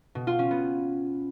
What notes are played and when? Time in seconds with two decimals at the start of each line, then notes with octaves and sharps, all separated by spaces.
0.15 B2
0.27 F4
0.39 C#4
0.51 B3